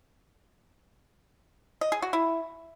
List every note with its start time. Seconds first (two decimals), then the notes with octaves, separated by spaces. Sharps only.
1.81 D#5
1.92 G#4
2.02 F#4
2.13 E4